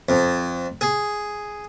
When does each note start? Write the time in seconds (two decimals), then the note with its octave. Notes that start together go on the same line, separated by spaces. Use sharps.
0.09 F2
0.81 G#4